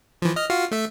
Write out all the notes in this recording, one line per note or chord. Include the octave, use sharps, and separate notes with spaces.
E3 F3
D#5 F6
F4 F#4 F5
A3 E5